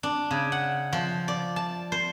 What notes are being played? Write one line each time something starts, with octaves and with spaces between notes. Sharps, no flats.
D4
C#3
F#5
F3
D5
A5
C5